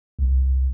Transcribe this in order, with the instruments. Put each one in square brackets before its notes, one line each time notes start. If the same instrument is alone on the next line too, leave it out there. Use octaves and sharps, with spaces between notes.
[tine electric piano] C2